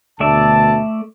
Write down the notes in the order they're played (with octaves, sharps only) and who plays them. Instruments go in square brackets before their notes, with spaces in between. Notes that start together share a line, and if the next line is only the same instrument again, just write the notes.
[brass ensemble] D2 B2 A5 [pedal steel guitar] A3 D5 E5